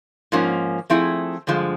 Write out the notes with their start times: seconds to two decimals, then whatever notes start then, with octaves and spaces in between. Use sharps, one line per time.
0.32 G#2 F3 A#3 C#4
0.90 F3 A3 C4 E4 G#4
1.47 G2 D3 F3 G#3